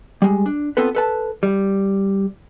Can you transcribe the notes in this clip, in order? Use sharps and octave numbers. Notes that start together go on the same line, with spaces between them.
G3 G#3
D4
B3 C4 F4 A4 B4
A4 B4 A5
G3